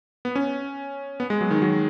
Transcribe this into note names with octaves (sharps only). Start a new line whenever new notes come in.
B3
C#4
B3
G#3
F#3
D#3
F#3